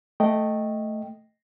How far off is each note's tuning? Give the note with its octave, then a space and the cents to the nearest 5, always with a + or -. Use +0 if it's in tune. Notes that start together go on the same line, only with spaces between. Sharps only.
A3 +0 D#5 +0 G5 +0